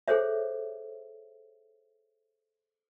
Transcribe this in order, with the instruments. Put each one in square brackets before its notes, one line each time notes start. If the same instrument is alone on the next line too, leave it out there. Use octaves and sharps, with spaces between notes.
[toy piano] G#4 A4 C5 C#5 E5